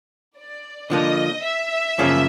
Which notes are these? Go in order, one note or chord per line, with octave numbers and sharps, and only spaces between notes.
D5
D3 F3 A#3 D4 D#5
E5
F#2 C#3 F3 A#3 C#4